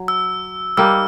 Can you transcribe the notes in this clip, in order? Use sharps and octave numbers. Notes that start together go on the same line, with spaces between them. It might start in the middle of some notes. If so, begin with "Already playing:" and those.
Already playing: F#3
E6
G3 A#3 D#4 E6